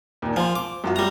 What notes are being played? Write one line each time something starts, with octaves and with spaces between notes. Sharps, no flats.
D#2 A#2
F3 G#5 C6
D6
F#2 F4 F#4
G3 A#5